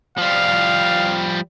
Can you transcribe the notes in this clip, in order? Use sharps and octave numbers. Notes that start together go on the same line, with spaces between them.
F3 G3 F5